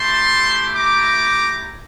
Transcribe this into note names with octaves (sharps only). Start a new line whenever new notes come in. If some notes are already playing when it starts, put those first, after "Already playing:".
Already playing: A3 E4 G4 A5 C6
A#5 D6